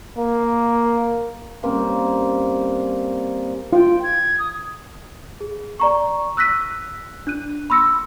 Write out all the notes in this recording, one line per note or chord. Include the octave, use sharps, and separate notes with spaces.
A#3
G3 A#3 C4 C#4
F4 G5
G#6
D#6
G#4
D5 A#5 C#6
E6 F#6 A#6 B6 D#7
D4 F#6 D#7
B5 C6 E6 A#6 C#7